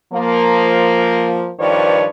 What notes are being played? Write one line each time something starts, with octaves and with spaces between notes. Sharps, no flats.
F3 A#3
G2 D#3 F3 B4 C#5 D5